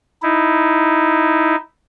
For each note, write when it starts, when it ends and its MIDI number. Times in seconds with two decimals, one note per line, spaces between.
0.23 1.56 63
0.23 1.56 64